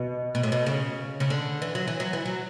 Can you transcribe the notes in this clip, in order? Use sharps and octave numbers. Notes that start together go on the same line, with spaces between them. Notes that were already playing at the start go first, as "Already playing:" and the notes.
Already playing: B2
B2
A2
B2
C#3
C#3
D3
E3
F#3
E3
F#3
E3
F#3